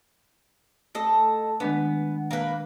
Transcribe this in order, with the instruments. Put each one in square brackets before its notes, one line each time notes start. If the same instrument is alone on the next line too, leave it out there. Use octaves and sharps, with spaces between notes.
[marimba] A3 [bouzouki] A4 D#5
[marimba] D#3 G#3 D4 [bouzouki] B3
[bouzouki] A#3 B4